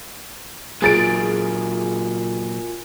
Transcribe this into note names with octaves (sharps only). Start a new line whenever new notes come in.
A#2 F#3 F4 G#4 A#4 G#5 A6 D7